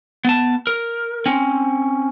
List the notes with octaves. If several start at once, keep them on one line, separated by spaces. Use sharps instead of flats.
B3 A5
A#4
C4 C#4